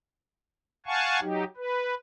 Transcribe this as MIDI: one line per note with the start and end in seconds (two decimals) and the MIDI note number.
0.86 1.20 77
0.86 1.20 78
0.86 1.20 80
0.86 1.20 81
0.86 1.20 85
1.21 1.44 54
1.21 1.44 63
1.21 1.44 67
1.57 1.95 71